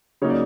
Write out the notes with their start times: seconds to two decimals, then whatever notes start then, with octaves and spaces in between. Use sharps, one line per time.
0.22 C#3 F#3 A#3 D#4 C#5
0.30 D5